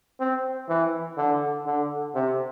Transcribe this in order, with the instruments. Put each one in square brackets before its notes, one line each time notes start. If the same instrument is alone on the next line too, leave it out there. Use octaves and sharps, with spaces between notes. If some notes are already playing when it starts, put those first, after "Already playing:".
[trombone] C4
E3
D3
D3
C3